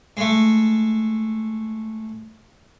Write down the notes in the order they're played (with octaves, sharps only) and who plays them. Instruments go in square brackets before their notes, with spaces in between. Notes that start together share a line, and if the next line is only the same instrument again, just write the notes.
[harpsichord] G#3 A3